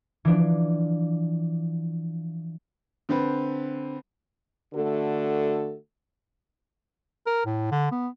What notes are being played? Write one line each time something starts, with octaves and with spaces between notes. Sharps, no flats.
E3 F3 D4
D3 C4 B4
D3 A3 F#4 A4
A#4
A2
D3
B3